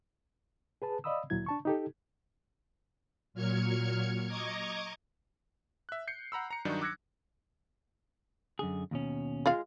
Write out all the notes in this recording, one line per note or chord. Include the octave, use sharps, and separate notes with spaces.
G#4 B4 A5
D5 D#5 F5 B5 D#6 E6
D2 A#2 F#3 E4 G#6
D4 A5 C#6
D#4 G4 A4
A#2 F#3 F6 G#6 C#7
D#5 A#5 C#6 D6 G#6
E5 F#6
G6 C7 C#7
F#5 A#5 B5 E6
A#5 C#7
G2 D#3 F#3 D4 D#4
D6 E6 F#6 G#6 A#6 C#7
F#2 D3 G#4
D#2 B2 C#4
G#3 F4 F5